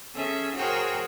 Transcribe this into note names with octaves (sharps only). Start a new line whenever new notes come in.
C#4 G#4 A4 E5
F#4 G#4 A#4 C5 C#5 G5